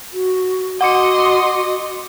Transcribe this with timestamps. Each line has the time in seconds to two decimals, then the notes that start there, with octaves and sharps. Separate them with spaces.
0.13 F#4
0.81 F#4 D#5 F#5 C6 D6 C#7